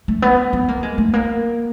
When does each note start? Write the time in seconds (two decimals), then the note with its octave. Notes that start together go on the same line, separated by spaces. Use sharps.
0.08 A3
0.22 B3
0.53 B3
0.68 A#3
0.83 G#3
0.98 A3
1.13 A#3